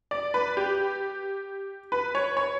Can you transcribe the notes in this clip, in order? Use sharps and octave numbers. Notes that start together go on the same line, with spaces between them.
D5
B4
G4
B4
C#5
C#5